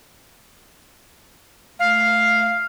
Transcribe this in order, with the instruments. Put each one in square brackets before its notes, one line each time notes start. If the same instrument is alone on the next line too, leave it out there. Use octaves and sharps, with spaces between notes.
[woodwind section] A3 F6 [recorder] F5